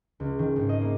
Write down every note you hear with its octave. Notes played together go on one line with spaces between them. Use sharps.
C#2
D#3
G#1
D#5
A#3